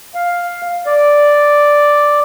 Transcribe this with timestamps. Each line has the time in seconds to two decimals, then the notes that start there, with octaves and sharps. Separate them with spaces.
0.15 F5
0.86 D5